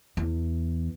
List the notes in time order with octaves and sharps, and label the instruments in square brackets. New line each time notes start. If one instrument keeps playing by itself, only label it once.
[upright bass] E2